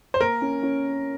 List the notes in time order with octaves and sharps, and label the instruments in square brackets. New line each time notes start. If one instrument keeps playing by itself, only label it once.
[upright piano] C5
[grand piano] A#3 [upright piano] A#4
[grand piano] C#4
C#4